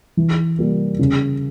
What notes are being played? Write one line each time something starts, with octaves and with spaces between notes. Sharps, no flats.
E3
G3 A#3
C#3